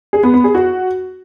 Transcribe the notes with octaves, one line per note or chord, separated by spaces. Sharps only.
G#4
B3
B3
G#4
F#4